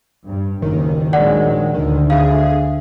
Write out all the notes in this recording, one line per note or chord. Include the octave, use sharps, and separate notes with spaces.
G2
F#1 D#2 G#2 D#3
A#1 F#3 G#3 D5 F#5
D2 D3 D#3
G#4 E5 F5